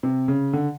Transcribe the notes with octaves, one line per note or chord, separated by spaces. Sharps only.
C3
C#3
D3